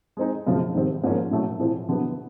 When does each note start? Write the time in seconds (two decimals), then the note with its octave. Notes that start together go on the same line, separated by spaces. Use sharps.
0.17 G#3 C4 D#4 G#4
0.47 F#2 C#3 F3 A3
0.75 G#2 D#3 G3 C4
1.03 G#2 F3 A#3 C#4 F4
1.31 A2 F#3 A3 C#4
1.59 A2 E3 A3 C4 F4
1.89 D3 F#3 B3